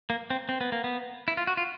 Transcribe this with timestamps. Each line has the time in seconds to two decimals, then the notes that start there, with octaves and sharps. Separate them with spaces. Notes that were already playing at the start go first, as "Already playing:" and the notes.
0.10 A#3
0.30 C4
0.49 C4
0.61 B3
0.72 A#3
0.84 B3
1.28 E4
1.37 F4
1.47 F#4
1.57 F4